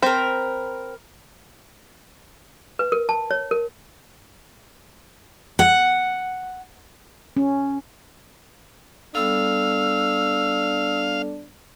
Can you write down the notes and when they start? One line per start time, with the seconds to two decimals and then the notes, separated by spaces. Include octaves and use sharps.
0.03 C4 A#4 C5 B5
2.79 B4
2.92 A#4
3.09 A5
3.31 C#5
3.51 A#4
5.59 F#5
7.37 C#4
9.15 G3 B3 D4 A4 F5 E6